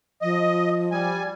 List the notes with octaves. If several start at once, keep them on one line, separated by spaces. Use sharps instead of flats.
F3 D#5
G3 G#5